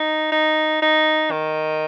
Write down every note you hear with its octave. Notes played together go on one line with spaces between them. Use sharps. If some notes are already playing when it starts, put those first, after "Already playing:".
Already playing: D#4
D#4
D#4
D#3